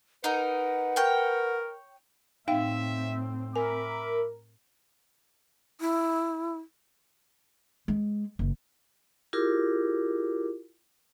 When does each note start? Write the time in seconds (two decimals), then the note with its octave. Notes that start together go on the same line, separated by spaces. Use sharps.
0.24 D#4 A#4 B4 F#5
0.96 A#4 C#5 G5
2.48 A2 C4 D#4 E5 F5 G5
3.56 A#4 E5 G#5 B5 D6
5.81 E4
7.88 G#3
8.39 F#1
9.33 E4 F4 G4 G#4 A#4 D6